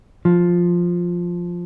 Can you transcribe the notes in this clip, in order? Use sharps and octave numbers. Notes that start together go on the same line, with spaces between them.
F3